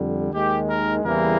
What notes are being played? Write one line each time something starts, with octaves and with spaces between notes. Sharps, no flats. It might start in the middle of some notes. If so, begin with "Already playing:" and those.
Already playing: F2 D3 G3
D#2 D#3 G#3 G4
A#4
E2 C#3 E3 G3 A#3 A#4